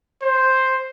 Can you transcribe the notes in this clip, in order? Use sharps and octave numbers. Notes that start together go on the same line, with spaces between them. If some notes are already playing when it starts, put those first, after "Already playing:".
C5